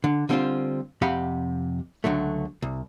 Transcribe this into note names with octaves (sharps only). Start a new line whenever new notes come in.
D3
D3 G3 C4 C#4 F4 C5
F2 C3 G4 F5 F#5 B5
C#2 D3 F#3 A3
C2